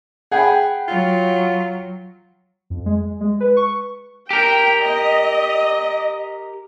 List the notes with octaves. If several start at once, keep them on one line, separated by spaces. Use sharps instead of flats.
G#4 F#5 G5 B5
F#3 F4
F2
G#3
G#3
B4
C#6
G4 A#4 G5
D#5